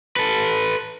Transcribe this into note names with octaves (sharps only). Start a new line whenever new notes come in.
A4 B4